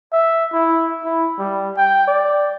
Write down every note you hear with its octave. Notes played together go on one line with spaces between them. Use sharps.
E5
E4
E4
G3
G5
D5